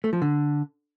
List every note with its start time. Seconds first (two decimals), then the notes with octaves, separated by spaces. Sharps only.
0.04 A3
0.13 F3
0.22 D3